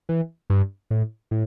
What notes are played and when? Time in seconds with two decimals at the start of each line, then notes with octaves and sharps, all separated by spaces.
0.09 E3
0.50 G2
0.90 A2
1.31 A2